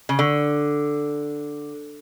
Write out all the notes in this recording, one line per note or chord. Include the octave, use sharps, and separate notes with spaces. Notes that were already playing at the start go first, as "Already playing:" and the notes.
C#3
D3